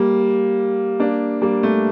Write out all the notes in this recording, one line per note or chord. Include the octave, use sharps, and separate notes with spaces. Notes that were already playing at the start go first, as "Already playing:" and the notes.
Already playing: G3 A#3
A#3 D4
G3 A#3
A3